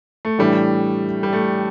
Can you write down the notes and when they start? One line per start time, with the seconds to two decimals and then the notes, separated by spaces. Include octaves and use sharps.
0.25 A3
0.39 A2 E3 G3 A3 D4
1.23 G3
1.33 A3